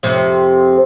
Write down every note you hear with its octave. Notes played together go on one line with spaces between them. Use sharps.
F2 C3